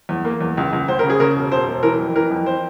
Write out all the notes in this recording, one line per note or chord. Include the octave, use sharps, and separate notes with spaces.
E2
A#3
E2
C#2
C#2
C#2 C5
C#3 A#4
G#4
C#3 A#4
E1
E1 C5
E1
E3 A#4
F2
E3 A#4
F2
C5